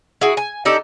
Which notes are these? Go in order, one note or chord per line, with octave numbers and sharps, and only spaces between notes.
E4 F#4 G#4
G#5
D4 D#4 G4 A4